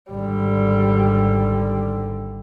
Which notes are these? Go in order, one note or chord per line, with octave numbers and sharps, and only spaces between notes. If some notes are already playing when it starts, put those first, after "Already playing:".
G#1 D3 G3